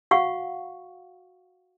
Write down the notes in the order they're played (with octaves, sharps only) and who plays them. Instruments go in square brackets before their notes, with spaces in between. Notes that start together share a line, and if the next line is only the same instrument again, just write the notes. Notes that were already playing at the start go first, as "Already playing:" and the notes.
[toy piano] F#4 F5 F#5 C#6